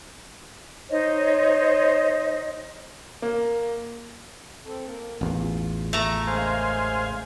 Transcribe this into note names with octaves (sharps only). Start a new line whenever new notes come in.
D#4 C5 C#5 D#5
A#3
C4 A4
A#3 A#4
A1 E2 F4
A3 A#5
C#3 G#3 A#3 C5 F5 G#5